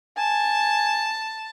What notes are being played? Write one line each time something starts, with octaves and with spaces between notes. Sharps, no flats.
G#5 A5